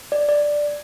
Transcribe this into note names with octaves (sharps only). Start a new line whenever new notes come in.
D5
D5